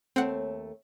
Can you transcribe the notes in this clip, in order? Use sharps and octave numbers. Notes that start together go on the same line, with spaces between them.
D#2 A3 C4 F#5